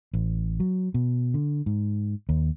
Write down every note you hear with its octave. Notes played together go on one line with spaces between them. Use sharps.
A1
F#3
B2
D3
G#2
D#2